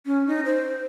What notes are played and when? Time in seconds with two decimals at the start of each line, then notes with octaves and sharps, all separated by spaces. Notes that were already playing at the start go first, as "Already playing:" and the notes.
0.06 C#4
0.27 D#4
0.45 C5